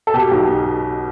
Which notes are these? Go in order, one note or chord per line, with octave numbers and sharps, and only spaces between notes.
A4
B2 G4
B1